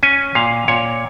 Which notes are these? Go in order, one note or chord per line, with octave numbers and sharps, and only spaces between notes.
C#4 G#5
A#2 F5
A#2 C#5